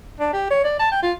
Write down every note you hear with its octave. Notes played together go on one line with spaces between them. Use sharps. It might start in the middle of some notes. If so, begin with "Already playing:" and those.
D4
G4
C#5
D5
A5
G5
F4